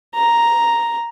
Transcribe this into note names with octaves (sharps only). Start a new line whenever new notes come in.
A#5